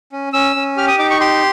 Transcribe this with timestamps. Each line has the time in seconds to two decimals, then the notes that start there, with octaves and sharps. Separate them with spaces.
0.12 C#4
0.33 C#4 E6
0.56 C#4
0.77 G4 F6
0.88 D#6
0.99 D#4 D6
1.11 C#6
1.20 G4 C6